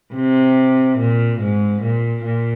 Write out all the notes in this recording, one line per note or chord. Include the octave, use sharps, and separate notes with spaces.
C3
A#2
G#2
A#2
A#2